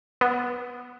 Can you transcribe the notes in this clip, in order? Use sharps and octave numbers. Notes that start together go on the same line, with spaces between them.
B3